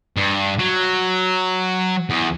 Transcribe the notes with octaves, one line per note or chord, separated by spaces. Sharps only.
G2
F#3
E2